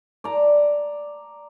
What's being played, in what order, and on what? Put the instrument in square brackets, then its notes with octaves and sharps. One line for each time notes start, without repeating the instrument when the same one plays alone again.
[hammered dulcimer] D5 A#5